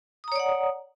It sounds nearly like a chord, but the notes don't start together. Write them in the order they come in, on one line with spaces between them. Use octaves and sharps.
D#6 A#5 C#5 D5 F#5